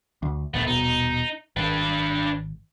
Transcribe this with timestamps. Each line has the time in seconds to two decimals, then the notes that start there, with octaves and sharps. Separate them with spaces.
0.23 D2
0.54 D1 A#1 A3 B3
0.67 D#1 B2 D#4
1.57 G#1 D4 B4